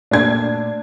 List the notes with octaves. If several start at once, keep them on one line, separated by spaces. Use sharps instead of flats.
A#2 A3 A#3 D4 G#6